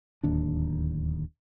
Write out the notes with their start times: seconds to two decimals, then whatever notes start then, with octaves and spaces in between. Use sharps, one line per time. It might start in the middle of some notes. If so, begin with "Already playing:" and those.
0.23 D1 D#2 D4